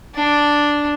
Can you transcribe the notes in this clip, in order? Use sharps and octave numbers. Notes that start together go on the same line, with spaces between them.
D4